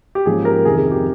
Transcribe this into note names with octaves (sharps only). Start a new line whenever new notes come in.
G4
G#2 F3 A#3 C#4 G#4
G4 A#4
F2 C3 D#3 G#4
G#4
G4